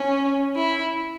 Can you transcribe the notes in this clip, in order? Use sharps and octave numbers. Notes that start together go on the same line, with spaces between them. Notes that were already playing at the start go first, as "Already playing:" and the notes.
Already playing: C#4
E4